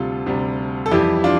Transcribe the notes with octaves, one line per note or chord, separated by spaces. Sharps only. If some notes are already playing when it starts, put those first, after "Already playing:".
Already playing: D2 C3 G3 F4 A4
D2 C3 G3
A4
F2 E3 G3 E4 G4
D4 F4